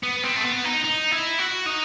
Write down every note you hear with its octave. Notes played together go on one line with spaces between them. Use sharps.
B3
C4
A3
B3
D#4
D#4
E4
F#4
D#4